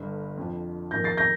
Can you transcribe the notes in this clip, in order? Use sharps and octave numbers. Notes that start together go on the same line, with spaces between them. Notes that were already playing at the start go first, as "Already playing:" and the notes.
Already playing: G1 G2 D3
F2 D3 F3
F2 D#3 A#3 G6 A#6
A6 C7
G6 A#6